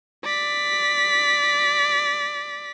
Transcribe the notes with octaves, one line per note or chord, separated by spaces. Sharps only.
D5 B6